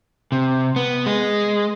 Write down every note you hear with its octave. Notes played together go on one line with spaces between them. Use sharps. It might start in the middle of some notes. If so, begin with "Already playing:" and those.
C3
B3
G#3